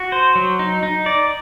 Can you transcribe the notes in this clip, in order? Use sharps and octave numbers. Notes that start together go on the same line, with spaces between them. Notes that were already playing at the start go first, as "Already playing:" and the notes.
Already playing: F#4
C5
F#3
D#4
D#4
D5